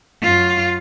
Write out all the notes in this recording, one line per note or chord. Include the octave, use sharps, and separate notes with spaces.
F#2 F4